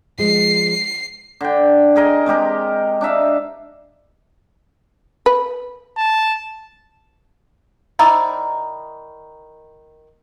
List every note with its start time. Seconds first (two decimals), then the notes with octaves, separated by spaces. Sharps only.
0.18 F3 G#3 C7
1.41 D3 G5
1.96 G#4 A#4 D#5 G#5
2.26 C3 G#3 G4 A#4
3.01 D4 D#4 E5 F5
5.26 B4
5.97 A5
7.99 D#3 D#4 E4 C5 D5